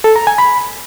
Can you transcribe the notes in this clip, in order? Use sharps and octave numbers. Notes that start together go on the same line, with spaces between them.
A4
A#5
G#5
B5